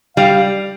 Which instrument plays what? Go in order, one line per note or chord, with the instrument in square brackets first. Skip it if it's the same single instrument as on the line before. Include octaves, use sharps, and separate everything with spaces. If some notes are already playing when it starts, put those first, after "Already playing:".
[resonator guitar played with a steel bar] G3 [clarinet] F5